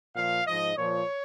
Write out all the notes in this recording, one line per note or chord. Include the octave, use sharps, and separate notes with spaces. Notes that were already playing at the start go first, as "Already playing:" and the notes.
A#2 F3 F5
G#2 F3 D#5
A#2 F3 C#5